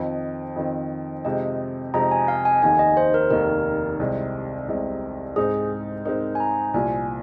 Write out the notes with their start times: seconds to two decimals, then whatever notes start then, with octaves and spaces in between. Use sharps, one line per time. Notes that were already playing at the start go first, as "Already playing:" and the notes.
Already playing: F2 D#3 C4 D#5
0.56 F2 D#3 C4
1.24 F2 C3 G#3 D#4 D#5
1.94 F2 C3 G#3 D#4 A#5
2.11 G#5
2.28 F5
2.45 G#5
2.62 F1 D#2 D#3 G#5
2.79 D#5
2.97 C5
3.14 A#4
3.30 F1 D#2 D#3 A#4
4.00 C2 C3 G#3
4.68 C2 C3 G#3
5.36 G#2 G#3 C4 D#4 G#4
6.05 G#2 G#3 C4 D#4 A#4
6.35 G#5
6.40 A#5
6.74 C2 A#2 F3 G#5